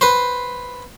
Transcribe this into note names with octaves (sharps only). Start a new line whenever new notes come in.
B4 C5